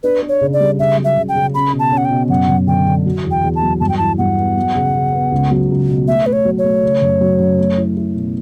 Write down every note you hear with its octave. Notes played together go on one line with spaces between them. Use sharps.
D4 B4
D4
C#5
C#3
D5
G3
C#3 E5
F#3
E5
C#3
G5
C#3
C#4 B5
B2
A5
C#4
F#5
G5
B2
F#2 F#5
F#2
D3 G5
D3
F#3
E2
G5
E2
A5
F#3
G2 A5
G5
E3 A5
G2 F#5
B3
F#3
C#3
C#3
B3
C#2
F#3
C#2
B2
A3 E5
A3 B4
C#5
F#3
C#5
A3
C#3
F#2
F#3
F#2
A3
E4
E4
B2